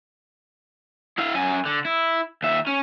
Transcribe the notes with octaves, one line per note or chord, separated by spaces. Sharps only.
E4 F5
F#2 G#5
D3
E4
D#2 E5
C#4